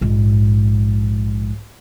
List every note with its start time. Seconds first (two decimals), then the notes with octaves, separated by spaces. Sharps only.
0.01 A#1 G#2